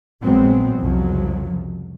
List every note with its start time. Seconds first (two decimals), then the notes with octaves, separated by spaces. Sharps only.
0.22 A#1 F#3 G#3 B3 C4
0.79 C2 F2 C#3 F3 F#3